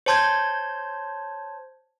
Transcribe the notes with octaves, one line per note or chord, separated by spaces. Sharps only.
C5 C#5 A5 C6 G6 G#6